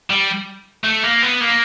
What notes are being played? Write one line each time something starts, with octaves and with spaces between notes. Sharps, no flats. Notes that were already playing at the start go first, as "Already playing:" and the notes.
G3
A3
A#3
B3
A#3